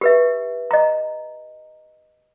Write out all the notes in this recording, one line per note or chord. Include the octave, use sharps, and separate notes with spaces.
G4 B4 E5
D#5 A#5